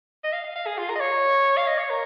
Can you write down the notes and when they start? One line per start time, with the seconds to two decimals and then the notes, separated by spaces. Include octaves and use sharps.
0.24 D#5
0.33 F5
0.44 F5
0.55 F5
0.66 G#4
0.78 F4
0.89 A#4
0.95 D#5
1.00 C#5
1.57 F5
1.67 D#5
1.78 C#5
1.90 A#4